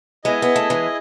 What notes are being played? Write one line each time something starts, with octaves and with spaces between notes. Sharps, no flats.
G#3 B3 E4 G#4 D#5
B3
A3
E3 G#3